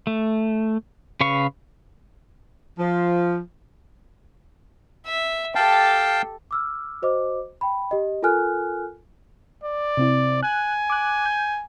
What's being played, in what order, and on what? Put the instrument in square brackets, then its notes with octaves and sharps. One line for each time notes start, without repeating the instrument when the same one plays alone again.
[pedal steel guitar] A3
C#3 B4 F5 C#6
[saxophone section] F3
[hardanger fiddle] E5
[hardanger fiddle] G4 A4 [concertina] F5 G5 A5
[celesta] D6 E6 F6
F#4 C5 D#5 D6
G5 B5
G4 D#5
F4 A4 A#4 G#5 F6 F#6
[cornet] D5
[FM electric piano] C3 C4 E4
[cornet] G#5 [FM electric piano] F#6
[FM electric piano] D6 F#6
G6